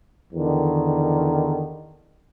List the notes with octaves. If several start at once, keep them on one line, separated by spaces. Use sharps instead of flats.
E2 D3 D#3